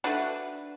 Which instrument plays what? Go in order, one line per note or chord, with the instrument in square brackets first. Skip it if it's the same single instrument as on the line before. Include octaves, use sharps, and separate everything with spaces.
[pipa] A3 D4 F#4 B4